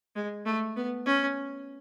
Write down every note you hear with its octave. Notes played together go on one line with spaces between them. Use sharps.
G#3
A3
B3
C#4